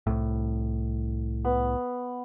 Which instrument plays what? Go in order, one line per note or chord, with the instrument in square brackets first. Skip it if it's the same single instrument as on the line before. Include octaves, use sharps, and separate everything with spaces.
[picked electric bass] C2 A2
[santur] B3